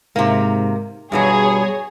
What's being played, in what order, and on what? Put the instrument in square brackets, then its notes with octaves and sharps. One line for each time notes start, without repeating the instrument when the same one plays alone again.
[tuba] G#2 [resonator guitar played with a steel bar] C3 A#3
[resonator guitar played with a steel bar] G2 B2 F#3 [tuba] G3 [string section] G#4 C#5